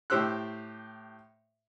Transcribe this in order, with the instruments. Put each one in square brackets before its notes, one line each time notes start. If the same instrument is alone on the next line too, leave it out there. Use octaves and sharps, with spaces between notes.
[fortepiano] A2 G4 C5 E6 F#6